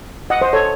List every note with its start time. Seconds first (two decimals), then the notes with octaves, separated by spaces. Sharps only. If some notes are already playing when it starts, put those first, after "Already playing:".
0.30 D#5 F#5
0.41 C5 D#5
0.53 A4 C#5